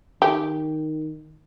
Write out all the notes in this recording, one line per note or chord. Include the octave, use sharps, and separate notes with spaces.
D#3 G4